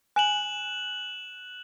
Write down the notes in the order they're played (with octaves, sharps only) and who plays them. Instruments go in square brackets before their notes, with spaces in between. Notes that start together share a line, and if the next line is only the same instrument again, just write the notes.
[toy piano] G#5 [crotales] F#6 E7 F#7